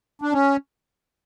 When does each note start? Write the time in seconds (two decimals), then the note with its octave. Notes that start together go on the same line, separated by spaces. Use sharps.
0.22 D4
0.33 C#4